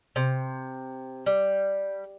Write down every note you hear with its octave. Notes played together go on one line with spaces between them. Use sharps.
C3
G3